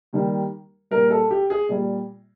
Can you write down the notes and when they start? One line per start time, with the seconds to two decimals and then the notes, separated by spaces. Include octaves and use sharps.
0.13 D#2 D#3 G3
0.91 A#2 G3 A#4
1.11 A4
1.31 G4
1.50 G#4
1.69 A#2 G3